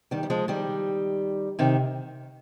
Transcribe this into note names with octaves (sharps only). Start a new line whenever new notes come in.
D#3 G3
G3
F3 G#3
D#3 G3
C3 D#3